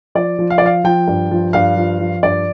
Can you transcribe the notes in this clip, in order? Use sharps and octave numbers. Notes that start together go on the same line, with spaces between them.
F3 D5
F3
F5
D5
F3 F5
F3 G5
G2
F3
G2 F5
F3
F3
G2 D5